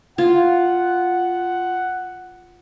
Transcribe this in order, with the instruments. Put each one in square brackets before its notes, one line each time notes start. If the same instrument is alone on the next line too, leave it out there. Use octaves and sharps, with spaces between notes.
[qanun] F4 [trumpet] F#5